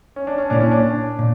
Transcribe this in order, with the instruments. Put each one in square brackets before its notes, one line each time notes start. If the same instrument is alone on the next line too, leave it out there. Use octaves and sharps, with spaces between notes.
[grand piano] C#4
D4
C#4
[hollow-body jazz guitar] A#2 A#3 E4 [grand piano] D4
[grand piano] C#4
D4
[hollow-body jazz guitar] A#2